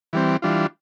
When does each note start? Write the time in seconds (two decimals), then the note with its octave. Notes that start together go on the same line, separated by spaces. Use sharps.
0.13 E3 G3 C4
0.42 E3 G3 D4 F4